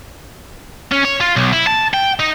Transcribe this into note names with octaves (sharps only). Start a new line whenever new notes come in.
C#4
C#5
F4
B1
E4
A5
G5
D#4